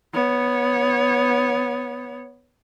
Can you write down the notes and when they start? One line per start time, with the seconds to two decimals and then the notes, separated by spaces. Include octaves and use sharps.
0.14 B3 C#5